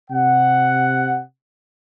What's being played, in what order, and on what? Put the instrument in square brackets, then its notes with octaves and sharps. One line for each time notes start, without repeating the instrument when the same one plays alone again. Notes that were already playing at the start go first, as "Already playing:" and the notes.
[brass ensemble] C3 F#5